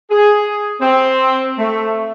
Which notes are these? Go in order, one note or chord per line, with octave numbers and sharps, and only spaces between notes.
G#4
C4
A3